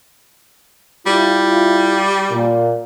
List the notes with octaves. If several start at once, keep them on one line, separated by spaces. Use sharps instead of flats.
G3 E4 F4
A#2